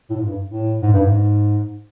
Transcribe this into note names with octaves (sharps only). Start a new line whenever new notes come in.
A2
G#2
G2
A2
G#2
G2
G#2